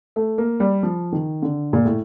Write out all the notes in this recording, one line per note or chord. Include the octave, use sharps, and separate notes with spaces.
A3
A#3
G3
F3
D#3
D3
A#2
A2